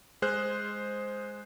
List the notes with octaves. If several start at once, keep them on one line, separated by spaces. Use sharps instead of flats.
G#3 G#4 C5 F6 F#6